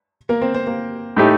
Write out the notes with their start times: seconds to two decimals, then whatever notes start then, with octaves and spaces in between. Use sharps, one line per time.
0.29 A#3 A#4
0.41 C4 C5
0.54 C4 C5
0.67 A#3 A#4
1.16 A2 A3 D#4 G4